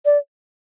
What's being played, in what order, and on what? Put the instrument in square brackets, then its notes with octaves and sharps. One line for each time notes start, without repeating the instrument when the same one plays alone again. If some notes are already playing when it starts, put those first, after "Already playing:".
[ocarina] D5